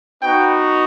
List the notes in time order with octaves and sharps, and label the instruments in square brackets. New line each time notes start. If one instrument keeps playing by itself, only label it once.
[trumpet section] B3 D#4 F#4 G5